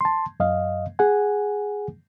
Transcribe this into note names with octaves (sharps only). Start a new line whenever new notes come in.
A5 C6
F#2 D#5 F5
G#4 F#5 G#5